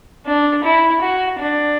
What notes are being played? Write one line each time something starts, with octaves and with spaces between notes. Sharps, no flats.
D4
E4
F#4
D4